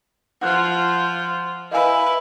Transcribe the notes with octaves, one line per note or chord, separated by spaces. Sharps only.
F3 F4 F#5 F#6
E4 B4 D#5 F5 G#5